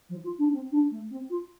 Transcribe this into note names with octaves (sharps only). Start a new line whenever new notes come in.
F3
F4
D4
C4
D4
A3
C4
F4